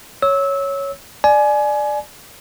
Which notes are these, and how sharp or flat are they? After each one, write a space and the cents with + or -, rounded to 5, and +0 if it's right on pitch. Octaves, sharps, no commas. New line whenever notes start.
C#5 +0 E6 -20
D5 +15 G#5 +25